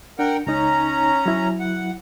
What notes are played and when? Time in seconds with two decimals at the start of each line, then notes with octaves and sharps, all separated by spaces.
0.19 D4 A#4 F#5 G5
0.47 C#2 C#4 D#4 A#5
1.26 F#3 E4
1.60 F#5